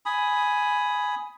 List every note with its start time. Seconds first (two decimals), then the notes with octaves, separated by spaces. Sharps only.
0.06 G#5 B5 D#6